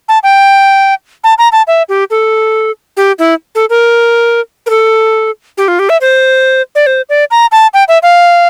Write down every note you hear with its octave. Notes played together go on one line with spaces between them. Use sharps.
A5
G5
A5
A#5
A5
E5
G4
A4
G4
E4
A4
A#4
A#4
A4
G4
F4
G4
E5
C5
D5
C5
D5
A#5
A5
G5
E5
F5